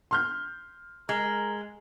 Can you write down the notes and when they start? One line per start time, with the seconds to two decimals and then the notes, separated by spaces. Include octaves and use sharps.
0.11 C6 F6 G6
1.09 G#3 A#4